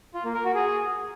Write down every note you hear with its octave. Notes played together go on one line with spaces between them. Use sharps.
F4
A#3
A#4
F#4
G#4